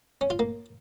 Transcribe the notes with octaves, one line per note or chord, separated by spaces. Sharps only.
C#4
F4
A#3